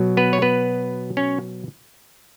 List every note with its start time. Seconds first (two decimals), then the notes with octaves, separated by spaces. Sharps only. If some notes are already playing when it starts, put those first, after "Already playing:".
Already playing: B2 F#3
0.17 B3 B4
0.33 C#5
0.42 B3 B4
1.17 C#4 C#5